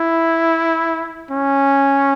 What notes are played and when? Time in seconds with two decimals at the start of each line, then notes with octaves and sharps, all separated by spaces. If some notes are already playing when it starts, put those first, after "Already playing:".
Already playing: E4
1.31 C#4